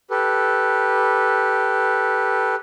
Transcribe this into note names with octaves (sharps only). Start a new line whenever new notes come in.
G4 A4 B4